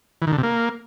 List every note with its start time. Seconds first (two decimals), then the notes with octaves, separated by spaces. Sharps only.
0.22 E3
0.27 D#3
0.33 D3
0.38 C3
0.43 A#3